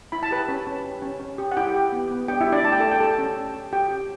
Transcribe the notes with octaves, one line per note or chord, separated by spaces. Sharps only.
E4 B5
A5
G4 B4 B5
C#4
C#4
G4
C#4
C#4
G4
F#5
E4 G4 G5
G4
B3
B3
D4 G4 G5
E4 E5
F#4
D4 D5
A3 A5
G5
A3 A4 A5
G5
G4 A4 A5
C#4
C#4
G4
F#4 G4 G5
C#4